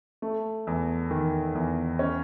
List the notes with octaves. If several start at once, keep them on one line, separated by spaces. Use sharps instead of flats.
A3
E2
D#3
E2
C#4